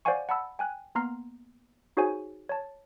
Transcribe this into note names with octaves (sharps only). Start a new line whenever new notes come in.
C5 D5 F5 F#5 G#5 C#6
F#5 A5 B5 E6
G5 G#5 F#6
A#3 B3 A#5 C6 F6 C7
D#4 F#4 G#4 C5 C#5 G#5
C#5 A5